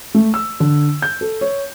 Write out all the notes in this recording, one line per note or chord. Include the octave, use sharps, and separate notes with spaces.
A3
E6
D3
G6
A4
C#5